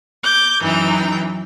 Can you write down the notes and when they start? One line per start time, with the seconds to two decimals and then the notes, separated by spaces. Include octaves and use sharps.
0.23 D6 G6
0.61 F#2 E3 D#4 G5